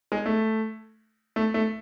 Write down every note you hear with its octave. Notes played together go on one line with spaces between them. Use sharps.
G#3
A3
A3
A3